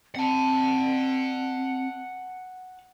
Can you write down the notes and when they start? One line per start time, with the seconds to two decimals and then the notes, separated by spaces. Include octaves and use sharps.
0.15 C4 F#5 A5